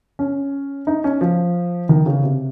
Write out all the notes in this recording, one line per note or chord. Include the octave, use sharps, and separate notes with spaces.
C#4
D#4
C#4
F3
D#3
C#3
C3